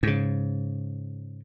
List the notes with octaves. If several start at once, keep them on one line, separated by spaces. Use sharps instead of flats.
G#2 C#3